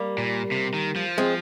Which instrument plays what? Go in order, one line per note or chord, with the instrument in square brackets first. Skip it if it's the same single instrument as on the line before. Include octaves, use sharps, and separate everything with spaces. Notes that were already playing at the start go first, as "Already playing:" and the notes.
Already playing: [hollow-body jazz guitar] G3 A#3
[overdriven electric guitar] A#2
C3
D#3
F3
[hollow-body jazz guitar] G#3 C4